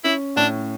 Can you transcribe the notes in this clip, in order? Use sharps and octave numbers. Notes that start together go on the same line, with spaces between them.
C#4 E4
A2 D4